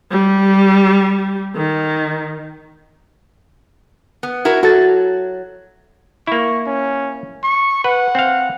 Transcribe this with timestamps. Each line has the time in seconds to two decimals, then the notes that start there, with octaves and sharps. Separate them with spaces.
0.11 G3
1.55 D#3
4.23 B3
4.45 E4 F#4 A#4
4.63 F#3 F#4 A4 A6
6.27 A#3 E4 C#6
6.66 C#4
7.43 C#6
7.84 B4 F#5
8.15 C4 F5